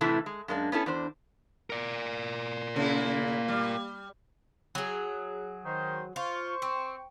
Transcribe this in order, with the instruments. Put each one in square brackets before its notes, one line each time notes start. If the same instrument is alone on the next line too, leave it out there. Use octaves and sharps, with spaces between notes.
[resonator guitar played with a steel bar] A2 C3 E3 A3 E4
G#3
F#2 G#3 A#3 D4
B3 C#4 E4 A4
E2 D4 C5
[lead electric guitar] A#4 D5
[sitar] C#3 E4 [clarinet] A#3
[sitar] G3
[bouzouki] F#3 G#4
[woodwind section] D#3 C5
[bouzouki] F4 [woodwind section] C5 C#6
[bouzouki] C4